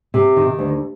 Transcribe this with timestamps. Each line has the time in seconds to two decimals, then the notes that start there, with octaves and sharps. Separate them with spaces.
0.14 C3
0.37 D#3
0.59 D2